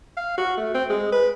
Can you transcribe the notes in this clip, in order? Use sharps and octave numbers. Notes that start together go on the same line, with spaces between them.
F5
F#4
A3
C4
G#3
B4